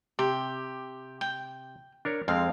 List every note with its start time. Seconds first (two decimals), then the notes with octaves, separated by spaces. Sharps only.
0.19 C3 G4
1.21 G5
2.05 D4 A#4 C#5
2.28 F2 G#3 C4 F5